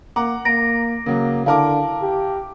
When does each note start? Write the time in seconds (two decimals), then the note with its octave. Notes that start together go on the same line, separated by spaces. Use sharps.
0.16 A#3 F#5 A#5 D6
0.45 A#3 A#5 A#6 D7
1.06 C#3 F#3 A#3
1.46 D3 E4 A#4 F5 A5 D6
2.01 G4